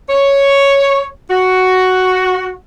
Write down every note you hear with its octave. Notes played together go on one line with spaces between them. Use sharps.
C#5
F#4